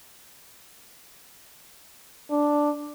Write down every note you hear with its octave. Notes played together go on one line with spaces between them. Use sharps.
D4